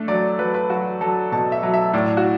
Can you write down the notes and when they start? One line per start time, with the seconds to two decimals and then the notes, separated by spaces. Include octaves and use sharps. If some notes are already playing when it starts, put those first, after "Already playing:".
Already playing: A3 D4 A4
0.08 F#3 D5
0.39 F#3 B4
0.54 B4
0.70 F#3 F#4
1.01 F#3 A4
1.32 B2 A5
1.52 E5
1.63 F#3
1.74 E5
1.94 A2 D5
2.17 F#4